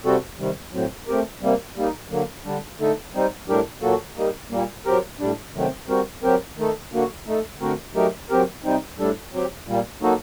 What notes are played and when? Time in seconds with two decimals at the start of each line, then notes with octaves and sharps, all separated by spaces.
0.05 C3 G3 C4 F#4 A4
0.38 C3 D#3 G3
0.73 A2 F#3 C4
1.08 A3 C4 G4 A#4
1.41 C3 G3 A#3
1.76 G3 A#3 D#4
2.10 D3 F#3 A#3
2.45 D3 G3 D4
2.79 D3 A3 D#4 A4
3.14 G3 C4 D#4
3.48 A2 G3 D4 G4 A#4
3.82 A#2 F#3 A#3 F#4 A4
4.17 G3 A#3 D#4
4.51 A#2 G3 A#3
4.86 F#3 C4 G4 A#4
5.20 A2 G3 D4
5.55 C3 D#3 F#3 A3 C4
5.88 G3 C4 F#4 A#4
6.23 F#3 C4 G4 A#4
6.57 D#3 A3 D#4 A4
6.92 D3 F#3 A#3 F#4
7.27 A3 D#4 A4
7.60 D3 A3 C4 F#4 A#4
7.95 F#3 A3 D#4 G4 A#4
8.30 F#3 C4 G4 A#4
8.64 C3 G3 C4 D#4
8.98 A2 G3 D4 A4
9.33 F#3 C4 G4
9.67 A#2 G3 A#3
10.02 F#3 A#3 D#4 F#4 A4